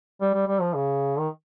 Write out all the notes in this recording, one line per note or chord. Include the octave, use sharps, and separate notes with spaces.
G3
G3
G3
F3
C#3
D#3